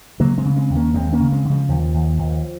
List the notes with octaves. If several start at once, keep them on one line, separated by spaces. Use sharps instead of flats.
C#3 F#3 A#3
G#3 C4
C#3
G#3 C4
D#2
A#3 C#4
D#2 G#3 C4
A#3 C#4
C#3
G#3 C4
C#3
F3 G#3
D#2 F3
D#2
D#2